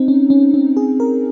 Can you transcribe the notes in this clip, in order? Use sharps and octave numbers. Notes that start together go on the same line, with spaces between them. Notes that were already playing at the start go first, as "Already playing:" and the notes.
Already playing: C4 D#4
C#4
C#4
C#4
G#4
A#4